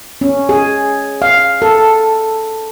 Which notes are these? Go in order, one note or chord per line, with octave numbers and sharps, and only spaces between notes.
C#4
G#4
F5
A4